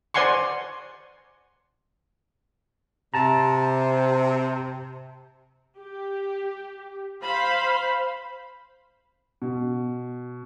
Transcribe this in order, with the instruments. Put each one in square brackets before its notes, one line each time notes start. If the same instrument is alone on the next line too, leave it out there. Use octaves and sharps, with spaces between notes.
[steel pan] C5 D5 F#5 G#5 C6 C#6
[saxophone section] C3 [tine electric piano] A5 A#5
[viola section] G4
C5 F5 B5
[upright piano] B2